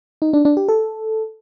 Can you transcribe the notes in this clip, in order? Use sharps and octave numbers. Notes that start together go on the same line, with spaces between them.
D#4
D4
D4
G4
A4